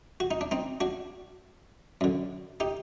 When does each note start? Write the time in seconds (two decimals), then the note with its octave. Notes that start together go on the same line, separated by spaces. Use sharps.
0.20 F#4
0.31 D#4
0.41 D4
0.51 C4 D#4
0.80 D4 F#4
2.01 F#2 D3
2.60 D#4 G4